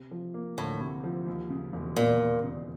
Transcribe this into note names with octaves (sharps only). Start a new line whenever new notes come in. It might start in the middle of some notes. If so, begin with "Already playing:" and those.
Already playing: C3
F3
A#3
D2 A2
C3
F3
D#2
C#3
E1
E1 A#2
D#2
C#3